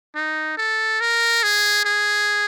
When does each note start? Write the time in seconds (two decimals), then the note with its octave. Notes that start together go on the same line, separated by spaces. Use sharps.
0.15 D#4
0.58 A4
1.00 A#4
1.43 G#4
1.85 G#4